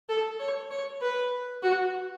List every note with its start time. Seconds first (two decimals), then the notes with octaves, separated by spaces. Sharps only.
0.09 A4
0.40 C#5
0.71 C#5
1.01 B4
1.63 F#4